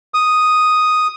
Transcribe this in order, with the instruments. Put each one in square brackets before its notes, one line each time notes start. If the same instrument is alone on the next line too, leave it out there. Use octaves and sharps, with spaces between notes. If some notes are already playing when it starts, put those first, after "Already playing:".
[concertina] D#6